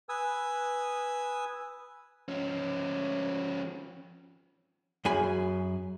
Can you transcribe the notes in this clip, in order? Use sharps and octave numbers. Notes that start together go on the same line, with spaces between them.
B4 G#5 D#6 E6
F3 C#4
F#2 G#4 G#5 B5